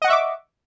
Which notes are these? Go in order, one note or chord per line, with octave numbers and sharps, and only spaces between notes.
D#5 E5 F#5 C#6 D6